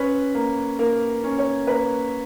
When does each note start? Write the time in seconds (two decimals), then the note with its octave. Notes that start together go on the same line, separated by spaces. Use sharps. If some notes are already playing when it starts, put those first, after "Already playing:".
Already playing: C#4 B4
0.35 A#3
0.79 A#3 A#4
1.24 C#4
1.38 C#5
1.67 A#3 B4